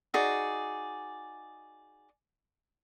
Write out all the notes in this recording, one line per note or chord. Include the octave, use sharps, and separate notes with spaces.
D#4 F#4 G#4 D5